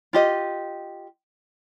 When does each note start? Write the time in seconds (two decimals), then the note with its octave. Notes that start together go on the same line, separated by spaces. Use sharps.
0.13 F4 G4 D#5